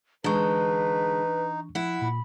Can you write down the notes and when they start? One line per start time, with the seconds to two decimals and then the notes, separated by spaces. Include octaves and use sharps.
0.24 D3 E3 G#3 D4 D#4 B4 C#6
1.75 F3 E4 F#5
2.02 A#2 B5